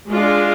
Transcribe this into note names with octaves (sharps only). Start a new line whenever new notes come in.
G#3 D4 F4